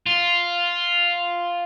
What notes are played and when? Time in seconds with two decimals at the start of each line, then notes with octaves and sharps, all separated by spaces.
0.06 F4